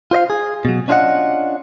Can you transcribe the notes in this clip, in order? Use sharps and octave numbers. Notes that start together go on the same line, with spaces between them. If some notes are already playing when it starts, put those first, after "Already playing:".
F4 C5 D#5 F5
G#4
B2 F#3
C#4 D4 F4 F#4 D#5 F#5